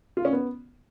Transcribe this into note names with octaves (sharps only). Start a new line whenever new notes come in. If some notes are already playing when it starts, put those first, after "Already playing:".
F4
C#4
B3